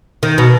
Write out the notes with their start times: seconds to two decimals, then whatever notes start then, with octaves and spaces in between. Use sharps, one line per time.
0.23 D#3
0.38 B2